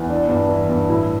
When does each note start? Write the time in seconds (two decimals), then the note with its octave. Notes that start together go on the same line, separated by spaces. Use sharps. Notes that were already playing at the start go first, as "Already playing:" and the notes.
Already playing: E2
0.09 E3 D4
0.29 G2
0.49 E3
0.69 G2
0.89 A2 E4